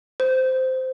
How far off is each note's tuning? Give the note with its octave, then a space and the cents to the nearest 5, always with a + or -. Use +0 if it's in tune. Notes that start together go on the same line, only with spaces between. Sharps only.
C5 -10